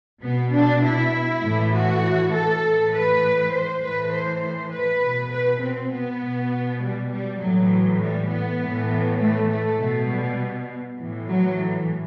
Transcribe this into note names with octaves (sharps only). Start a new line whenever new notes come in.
B2 B3
D4
E4
A2 E3
F#4
A4
A2 E3
B4
C5
A2 E3 B4
C5
C5
B4
B2
B4
C4
B3
B2
G3
G3
A2 E3 F#3
G3
B3
A2 E3
A3
A3
B2
G3
A2 E3
F#3
E3